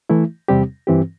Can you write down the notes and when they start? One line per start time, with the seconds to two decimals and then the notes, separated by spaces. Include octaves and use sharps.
0.10 E3 A3 E4
0.48 E2 C3 G3 C4 G4
0.87 G2 E3 C4 G4